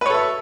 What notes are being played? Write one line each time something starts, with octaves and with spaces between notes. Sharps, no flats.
A4 B4 C#5 E5